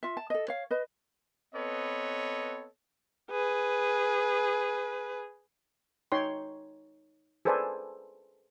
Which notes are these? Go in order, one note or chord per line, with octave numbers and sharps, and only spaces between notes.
F4 E5
A5
A4 D#5
C#5 F5
B4 D#5
B3 C4 A4 B4 C#5 D#5
G#4 B4
D#4 C#5 G5 C6
G#4 A4 B4 C5 D5 G#5